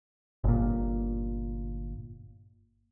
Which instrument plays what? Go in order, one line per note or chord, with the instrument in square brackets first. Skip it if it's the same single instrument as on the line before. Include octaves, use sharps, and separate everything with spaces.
[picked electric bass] G1 A#2